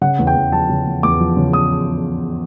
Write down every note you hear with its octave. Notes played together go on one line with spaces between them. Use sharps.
C#3 F#5
E2
G5
E2
F3 A5
C#3
E2
E2 D6
F3
C#3
E2 D#6